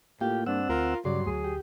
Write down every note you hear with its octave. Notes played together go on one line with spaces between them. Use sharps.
A2 A#3 F4 G4 G5
G2 C4 D4 F#5 E6
D2 F4 A#4
G2 C#3 F#3 D5 C6
D2 G#4
G4